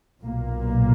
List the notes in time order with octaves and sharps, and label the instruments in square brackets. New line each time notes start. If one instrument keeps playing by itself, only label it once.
[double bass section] B1 A#2 A#3